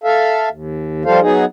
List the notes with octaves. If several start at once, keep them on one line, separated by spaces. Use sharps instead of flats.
A4 E5 F5
D#2
F3 G3 F4 A4 C5 F5
F#3 B3 D#4 G#4